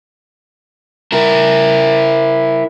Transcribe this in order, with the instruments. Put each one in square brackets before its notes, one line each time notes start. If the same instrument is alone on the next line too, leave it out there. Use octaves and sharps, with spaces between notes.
[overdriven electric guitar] E4 A#4